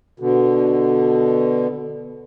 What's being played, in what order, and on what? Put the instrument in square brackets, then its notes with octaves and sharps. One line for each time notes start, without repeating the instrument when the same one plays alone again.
[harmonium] B2 D3